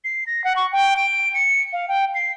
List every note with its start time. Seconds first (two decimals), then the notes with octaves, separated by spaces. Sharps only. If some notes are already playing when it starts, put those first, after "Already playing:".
0.04 C7
0.27 A#6
0.44 F#5
0.56 C#6
0.72 G5
0.97 D7
1.34 C#7
1.73 F5
1.88 G5
2.15 C7